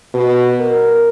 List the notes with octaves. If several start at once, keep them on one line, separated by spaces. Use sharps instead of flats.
B2
A#4